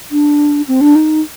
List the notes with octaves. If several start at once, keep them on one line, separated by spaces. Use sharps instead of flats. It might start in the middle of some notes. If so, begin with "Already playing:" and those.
D4
C4
D4
D#4